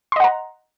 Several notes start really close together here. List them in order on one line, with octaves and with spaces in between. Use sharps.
C6 D#5 F#5 A#5